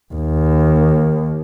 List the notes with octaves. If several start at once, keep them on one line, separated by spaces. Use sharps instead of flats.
D#2